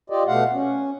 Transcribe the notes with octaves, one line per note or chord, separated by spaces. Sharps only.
F4 G4 D5 D#5
B2 A3 F5 F#5
C#4